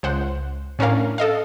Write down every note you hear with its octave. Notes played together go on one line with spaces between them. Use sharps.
C#2 C5 F#5
A2 C#4 D4 A#4 F5
A4 D#5 F5